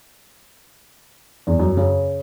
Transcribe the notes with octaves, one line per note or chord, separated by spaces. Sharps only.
E2
F#2
C#3